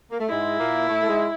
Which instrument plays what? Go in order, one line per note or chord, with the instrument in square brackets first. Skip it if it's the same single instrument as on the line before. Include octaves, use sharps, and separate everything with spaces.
[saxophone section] A#3
A3
[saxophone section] G#2 G#3 [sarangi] E4
[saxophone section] A#2 A#3
A2 A3
A3
G#2 G#3